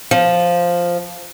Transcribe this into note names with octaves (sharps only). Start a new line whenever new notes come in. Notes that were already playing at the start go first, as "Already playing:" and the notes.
F3